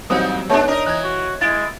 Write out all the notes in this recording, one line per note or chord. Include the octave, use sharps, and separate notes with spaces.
E3 F#3 G3 A#3 C4 D#4 D#6
G#3 B3 D4 D#4 C#5
D4 D#4 A#4 D#5
E3 F#6 G#6
F#4
G#3 E4 A6 D7